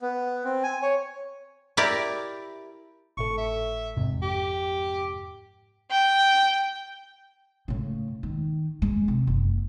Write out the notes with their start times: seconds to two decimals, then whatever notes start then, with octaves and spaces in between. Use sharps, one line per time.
0.02 B3
0.45 C4
0.64 G#5
0.82 C#5
1.77 E4 G4 A#4 D5
3.17 G#1 A2 A4 C#6
3.38 E5
3.97 F2 G#2 C3
4.22 G4
5.91 G5
7.68 A2 C#3
8.23 D#3
8.82 G#3
9.08 C3
9.27 F#1